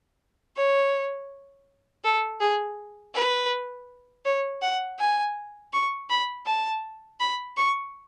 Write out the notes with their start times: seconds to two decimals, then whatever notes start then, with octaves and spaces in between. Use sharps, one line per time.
0.56 C#5
2.04 A4
2.40 G#4
3.15 B4
4.25 C#5
4.62 F#5
4.99 G#5
5.73 C#6
6.10 B5
6.46 A5
7.20 B5
7.57 C#6